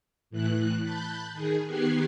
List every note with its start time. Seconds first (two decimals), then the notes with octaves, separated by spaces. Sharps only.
0.30 A2 E3 F#6
0.82 A5 B5 F#6 G6
1.33 D#3 G#4
1.67 D#3 B3 G4 F#6 G#6 C7